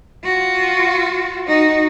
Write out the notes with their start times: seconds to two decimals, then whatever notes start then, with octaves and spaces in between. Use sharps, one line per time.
0.24 F4 F#4
1.47 D#4 F#4